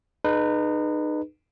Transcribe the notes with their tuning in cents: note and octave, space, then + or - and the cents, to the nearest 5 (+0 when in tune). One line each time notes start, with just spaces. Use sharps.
D#4 -30 G#4 +30 B4 +0